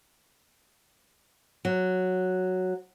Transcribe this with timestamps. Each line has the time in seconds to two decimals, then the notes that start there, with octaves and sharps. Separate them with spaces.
1.65 F#3